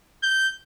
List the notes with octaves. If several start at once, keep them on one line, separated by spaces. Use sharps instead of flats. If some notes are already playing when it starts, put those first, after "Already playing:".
G6